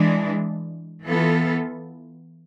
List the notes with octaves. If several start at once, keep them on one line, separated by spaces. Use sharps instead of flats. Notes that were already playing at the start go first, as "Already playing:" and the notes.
Already playing: E3 G#3 D4
E3 B3 F4 A4